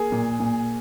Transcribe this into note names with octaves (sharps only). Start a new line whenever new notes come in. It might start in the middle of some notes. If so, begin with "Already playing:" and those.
Already playing: A#3 G#4
A#2
A#2